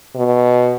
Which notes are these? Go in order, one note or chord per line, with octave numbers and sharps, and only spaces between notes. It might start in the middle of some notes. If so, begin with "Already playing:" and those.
B2